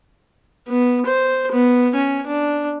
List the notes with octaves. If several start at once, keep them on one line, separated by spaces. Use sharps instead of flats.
B3
C5
B3
C#4
D4